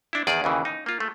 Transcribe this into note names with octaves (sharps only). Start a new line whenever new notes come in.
D4 E4
E2 D#3 G#4 D5
D#2 C#3 E3
D#4
A#3 F4
A3